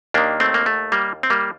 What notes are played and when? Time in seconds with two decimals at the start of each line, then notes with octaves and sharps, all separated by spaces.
0.14 D#2 D#3 A#3 D4
0.40 A3 C4
0.54 A#3
0.66 A3
0.92 G3 A#3
1.23 C4
1.30 G3 A#3